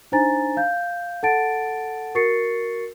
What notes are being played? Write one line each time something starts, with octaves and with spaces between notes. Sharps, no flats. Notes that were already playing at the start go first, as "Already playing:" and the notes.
D4 D#4 C5 G#5 A#5 A6
F5 G6
A4 F#5 A5 A6 D7
F#4 A#4 C#6 A6 C7 C#7